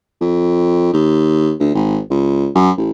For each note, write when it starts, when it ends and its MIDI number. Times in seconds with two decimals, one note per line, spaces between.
0.21 0.93 41
0.93 1.53 39
1.60 1.73 38
1.75 1.99 32
2.10 2.48 37
2.55 2.71 42
2.77 2.91 33